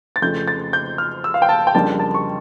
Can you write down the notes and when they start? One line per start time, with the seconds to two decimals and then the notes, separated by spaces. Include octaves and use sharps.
0.16 A6
0.22 F2 C#3 F3 A3 G6
0.48 A6
0.73 G6
0.98 F6
1.24 E6
1.34 F5
1.42 G5
1.49 A5
1.67 G5
1.74 F2 C#3 G3 A#3 D4 A5
1.99 A5
2.14 C#6